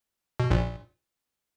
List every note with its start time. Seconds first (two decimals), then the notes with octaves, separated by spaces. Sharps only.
0.40 B2
0.50 A#1 A#2